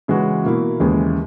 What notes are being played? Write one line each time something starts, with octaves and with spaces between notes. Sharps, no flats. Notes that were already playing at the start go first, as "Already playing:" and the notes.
C#3 E3 G#3 C#4 F#4
B2 A#3 E4
D#2 C#3 E3 G#3